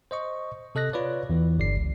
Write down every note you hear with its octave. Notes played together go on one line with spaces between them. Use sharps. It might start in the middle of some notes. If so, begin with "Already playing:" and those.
C5 D#5 C#6
C3 A4 D#5 F#6 A#6
F4 B4 C#5 D5
E2 E3
G1 D5 C7
C#2